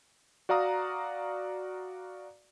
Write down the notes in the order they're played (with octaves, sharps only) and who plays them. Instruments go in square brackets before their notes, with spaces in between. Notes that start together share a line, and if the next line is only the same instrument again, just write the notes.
[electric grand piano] F#4 D5 F5 A#5 D#6